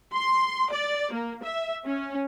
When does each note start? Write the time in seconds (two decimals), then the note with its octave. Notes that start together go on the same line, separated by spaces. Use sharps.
0.14 C6
0.71 D5
1.12 A#3
1.43 E5
1.85 C#4